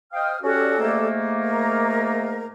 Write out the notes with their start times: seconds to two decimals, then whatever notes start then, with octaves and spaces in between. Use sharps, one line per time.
0.13 C5 D#5 F5 G5 D#6 F6
0.43 C#4 F#4 G4 A4 D5
0.79 G#2 A3 A#3
1.44 A#4